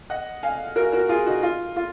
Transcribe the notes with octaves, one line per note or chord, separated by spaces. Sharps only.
D#5 F#5
F5 G#5
F#4 A#4
F#4 A#4
F4 G#4
D#4 F#4
F4
F4